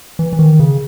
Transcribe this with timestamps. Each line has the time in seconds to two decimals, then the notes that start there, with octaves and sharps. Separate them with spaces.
0.19 E3
0.33 E3
0.39 D#3
0.60 C#3